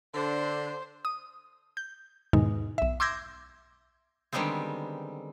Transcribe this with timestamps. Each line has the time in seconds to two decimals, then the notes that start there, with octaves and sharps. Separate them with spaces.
0.14 D3 C5
1.05 D#6
1.77 G6
2.33 E2 G#2 B2 D#3 G#3 D#4
2.78 B1 E5
3.00 C6 D6 E6 G6 G#6 A#6
4.33 D3 D#3 G3 G#3 B3 C4